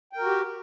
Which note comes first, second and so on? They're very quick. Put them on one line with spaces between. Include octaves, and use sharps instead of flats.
G5 A#4 F#4 G4